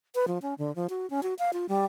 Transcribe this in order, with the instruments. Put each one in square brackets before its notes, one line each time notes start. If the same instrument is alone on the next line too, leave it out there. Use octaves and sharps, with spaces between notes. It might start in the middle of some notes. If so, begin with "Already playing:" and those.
[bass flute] B4
F3
C#4
D3
F3
F#4
C#4
F#4
F5
F4
G3